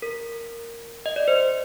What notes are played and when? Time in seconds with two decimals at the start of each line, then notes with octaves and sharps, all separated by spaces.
0.02 A#4
1.06 D#5
1.16 D5
1.28 C5